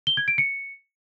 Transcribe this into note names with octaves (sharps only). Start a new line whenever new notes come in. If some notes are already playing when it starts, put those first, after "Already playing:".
G7
G#6
D7
C#7